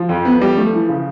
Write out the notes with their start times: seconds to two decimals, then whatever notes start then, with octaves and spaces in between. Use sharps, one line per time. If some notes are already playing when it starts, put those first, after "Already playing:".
Already playing: F3
0.09 F2
0.25 B3
0.41 G3
0.57 A3
0.73 E3
0.89 C#3